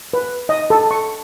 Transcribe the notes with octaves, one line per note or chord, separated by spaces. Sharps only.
B4
D#5
A4
C#6